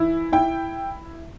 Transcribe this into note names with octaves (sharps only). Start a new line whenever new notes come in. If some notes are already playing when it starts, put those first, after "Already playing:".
Already playing: E3 E4
E4 G5